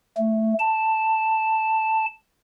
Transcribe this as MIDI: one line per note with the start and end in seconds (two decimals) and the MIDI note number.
0.17 0.54 57
0.59 2.05 81